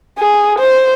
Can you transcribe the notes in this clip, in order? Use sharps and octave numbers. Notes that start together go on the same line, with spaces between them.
G#4
C5